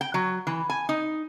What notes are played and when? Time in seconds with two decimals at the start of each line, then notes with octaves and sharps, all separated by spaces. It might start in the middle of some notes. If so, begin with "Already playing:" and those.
0.01 G5
0.14 F#3
0.47 E3
0.70 G#5
0.89 D#4